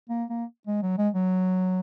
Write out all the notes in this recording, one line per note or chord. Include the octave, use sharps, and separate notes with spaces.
A#3
A#3
G#3
F#3
G#3
F#3